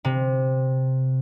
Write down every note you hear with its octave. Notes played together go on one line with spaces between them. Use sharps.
C3